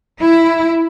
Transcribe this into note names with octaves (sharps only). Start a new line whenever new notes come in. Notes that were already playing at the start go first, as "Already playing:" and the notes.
E4